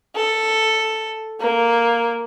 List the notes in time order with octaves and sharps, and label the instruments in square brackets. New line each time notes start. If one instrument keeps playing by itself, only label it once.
[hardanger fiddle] A4
A#3